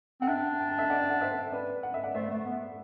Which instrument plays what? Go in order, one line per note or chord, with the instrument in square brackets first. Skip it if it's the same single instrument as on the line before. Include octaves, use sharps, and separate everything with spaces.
[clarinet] C4 [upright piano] F#5
[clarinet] D4 [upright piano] E5 G5
[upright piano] G5
A5
E5 G5
D5 F#5
F#5
C5 E5
B4 D5
F#5
E5
D5 F#5
[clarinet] A3 [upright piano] C5 E5
[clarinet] A3
B3